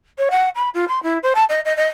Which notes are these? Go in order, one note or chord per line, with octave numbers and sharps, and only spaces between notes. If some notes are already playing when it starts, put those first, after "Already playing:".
C#5
F#5
B5
F4
C6
E4
C5
A5
D#5
D#5
D#5